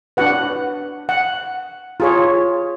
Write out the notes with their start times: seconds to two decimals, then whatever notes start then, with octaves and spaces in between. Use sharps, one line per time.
0.17 D4 F#4 B4 F#5
1.09 F#5
2.00 F4 G#4 C#5